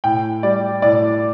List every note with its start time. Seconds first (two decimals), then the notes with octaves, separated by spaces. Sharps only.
0.04 A2 G5
0.43 G3 D5
0.82 A2 D5